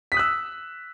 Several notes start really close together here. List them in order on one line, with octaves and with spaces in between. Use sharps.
B6 D#6 F#6 E6